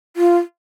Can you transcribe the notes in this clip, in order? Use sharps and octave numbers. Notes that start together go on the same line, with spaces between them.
F4